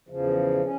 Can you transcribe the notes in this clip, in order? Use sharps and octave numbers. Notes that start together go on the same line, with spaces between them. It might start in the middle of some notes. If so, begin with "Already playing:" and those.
E2 C#3 F3
C#4